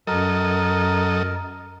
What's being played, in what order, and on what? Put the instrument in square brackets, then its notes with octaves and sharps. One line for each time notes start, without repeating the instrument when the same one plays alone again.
[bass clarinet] F#2 [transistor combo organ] F#3 A4 D#5 [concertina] A#4